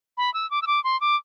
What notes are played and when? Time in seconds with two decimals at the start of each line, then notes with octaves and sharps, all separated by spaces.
0.17 B5
0.34 E6
0.51 D6
0.62 E6
0.67 D6
0.84 C6
1.01 D6